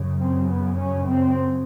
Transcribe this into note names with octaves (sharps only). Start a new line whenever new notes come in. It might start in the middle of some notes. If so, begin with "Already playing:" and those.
Already playing: F#2 C#3
C4
B3
C#4
C4